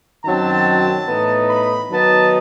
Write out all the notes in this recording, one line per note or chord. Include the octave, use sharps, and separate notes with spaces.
F#2 D#3 F#3 C4 A5
A2 E3 B3 D#4
B5
D#3 F#3 B3 D#4 A5